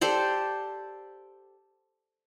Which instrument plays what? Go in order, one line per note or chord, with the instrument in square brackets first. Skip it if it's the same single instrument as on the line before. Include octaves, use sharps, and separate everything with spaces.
[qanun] G4 A4 C5 D5